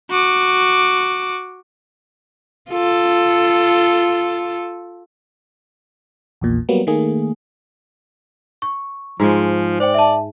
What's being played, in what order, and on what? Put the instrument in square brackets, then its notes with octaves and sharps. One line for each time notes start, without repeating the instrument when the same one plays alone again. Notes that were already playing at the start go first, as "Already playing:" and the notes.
[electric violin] F#4 D6
[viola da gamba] F4 A4
[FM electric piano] A#1 E2 A#2
F#3 G3 A#3 B3
D#3 A3 A#3 G#4
[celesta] C#6
[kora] G#2 G#3 [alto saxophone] F3
[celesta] C5 G5 [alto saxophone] D5
[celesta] E5 A5